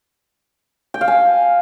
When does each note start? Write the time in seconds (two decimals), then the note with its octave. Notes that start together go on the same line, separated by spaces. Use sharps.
0.94 G5
1.01 F5
1.08 G#5